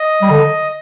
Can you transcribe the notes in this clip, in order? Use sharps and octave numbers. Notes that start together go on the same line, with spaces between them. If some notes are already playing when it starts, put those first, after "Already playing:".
Already playing: D#5
G3
D3